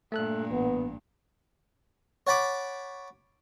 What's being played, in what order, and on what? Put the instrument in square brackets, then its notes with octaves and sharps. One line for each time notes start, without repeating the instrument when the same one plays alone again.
[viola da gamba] G2 A#2 [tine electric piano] A3 A4 F#6
[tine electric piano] A1 [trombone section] B3
[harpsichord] C#5 F#5 A5 B5 D6